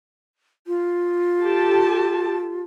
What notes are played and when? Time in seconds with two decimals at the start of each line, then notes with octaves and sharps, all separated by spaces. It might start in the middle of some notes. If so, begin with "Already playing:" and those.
0.67 F4
1.41 G4 A4 A5